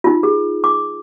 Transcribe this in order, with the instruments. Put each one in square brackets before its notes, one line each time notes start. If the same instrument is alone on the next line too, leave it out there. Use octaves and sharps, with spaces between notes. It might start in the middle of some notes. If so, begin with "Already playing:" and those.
[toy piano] D#4 F4
G#4
D6